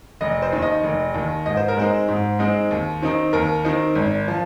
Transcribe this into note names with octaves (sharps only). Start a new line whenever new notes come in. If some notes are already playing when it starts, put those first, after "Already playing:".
F1 D#5
C5
D#2 D#3
D#5
F1
D#2 D#3
G#2 D#5
C5
A#4
G#3 C4 D#4 C5
G#2
G#3 C4 D#4
D#2
D#3 C4 D#4
D#2 A#4
D#3 C4 D#4
G#1
F3